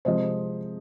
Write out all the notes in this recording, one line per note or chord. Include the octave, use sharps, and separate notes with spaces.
C3 F3 G#3 C5 D#5